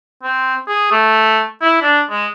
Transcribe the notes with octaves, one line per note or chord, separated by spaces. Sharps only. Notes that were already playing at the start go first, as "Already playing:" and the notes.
C4
G#4
A3
E4
D4
G#3